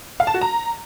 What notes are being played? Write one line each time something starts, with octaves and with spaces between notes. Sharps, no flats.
F5
A5
F#4
A#5